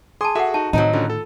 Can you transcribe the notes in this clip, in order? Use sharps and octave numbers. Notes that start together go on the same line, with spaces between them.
G#4 G#5 A5 C6 D#6
F#4 G#4 A4 E5 F#5
D#4 F#4 A5
A2 D#3 F#3 C4 D#4 D#7
D3 C#4 F4
A4